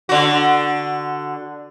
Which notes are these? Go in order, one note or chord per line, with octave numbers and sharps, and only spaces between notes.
D3 F#4